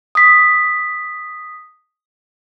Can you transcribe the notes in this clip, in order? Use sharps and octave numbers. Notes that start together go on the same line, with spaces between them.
D#6 B6